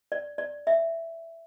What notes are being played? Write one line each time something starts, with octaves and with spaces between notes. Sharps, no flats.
D5
D5
E5